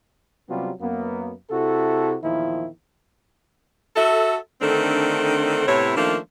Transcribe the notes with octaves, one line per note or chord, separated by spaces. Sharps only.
C3 F#3 G3 B3 C#4 F4
F#2 A#3 B3
C3 E4 F#4 A4
E2 A#2 D#3 F3 E4
F#4 A4 E5
D3 D#3 A3 C4 D4 A4
A2 C3 B3 E4 C#5
D#3 F3 A3 A#3 C#4 D4